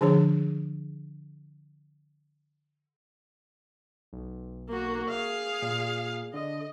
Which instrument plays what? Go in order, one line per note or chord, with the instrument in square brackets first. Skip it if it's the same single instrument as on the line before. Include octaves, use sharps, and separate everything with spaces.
[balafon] D3 F3 D4 G#4 C#5
[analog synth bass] B1
[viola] A#3 F#4
G#4 F5
[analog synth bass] A#2
[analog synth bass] D3 [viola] D#5